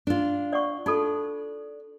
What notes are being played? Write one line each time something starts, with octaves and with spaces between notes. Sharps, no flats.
D4 F4
D5 F#5 C#6
D4 D#4 F4 A4